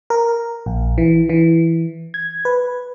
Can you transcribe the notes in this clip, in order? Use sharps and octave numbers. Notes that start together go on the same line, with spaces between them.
A#4
A#1
E3
E3
G#6
B4